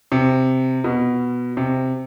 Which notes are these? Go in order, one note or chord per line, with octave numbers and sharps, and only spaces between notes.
C3
B2
C3